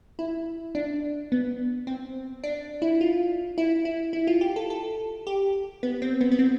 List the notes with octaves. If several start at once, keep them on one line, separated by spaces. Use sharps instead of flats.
E4
D4
B3
C4
D4
E4
F4
E4
E4
E4
F4
G4
A4
A4
G4
B3
C4
B3
B3
C4